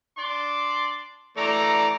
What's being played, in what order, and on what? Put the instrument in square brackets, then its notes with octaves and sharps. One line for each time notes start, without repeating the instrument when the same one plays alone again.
[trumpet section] D4 D5 C6
[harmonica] E3 A3 D5 [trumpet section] A#5